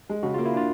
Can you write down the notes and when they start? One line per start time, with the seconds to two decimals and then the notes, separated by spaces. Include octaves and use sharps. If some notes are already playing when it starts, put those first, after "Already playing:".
0.09 G#3
0.23 C#3 F#4
0.34 A#3 F4
0.45 E4
0.53 D4 F4